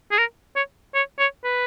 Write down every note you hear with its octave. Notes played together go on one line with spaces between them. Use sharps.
G#4
A#4
C#5
C#5
C#5
B4